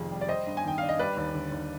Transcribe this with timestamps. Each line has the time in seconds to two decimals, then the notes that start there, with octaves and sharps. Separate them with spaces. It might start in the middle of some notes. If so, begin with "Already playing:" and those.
Already playing: F1 F2 D#3 G#4
0.11 G3
0.21 D5
0.29 G3 C5 D#5
0.47 G2
0.57 G#5
0.64 D#3 G5
0.78 D4 F5
0.89 D#5
0.99 G3 B4 D5
1.17 D#2
1.34 D3
1.52 D#2